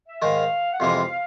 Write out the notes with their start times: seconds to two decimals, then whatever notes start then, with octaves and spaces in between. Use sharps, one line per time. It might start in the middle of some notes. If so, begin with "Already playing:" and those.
0.08 E5
0.22 G#2 D#3 G#3 F5
0.73 F#5
0.80 F2 C3 E3 G#3 F5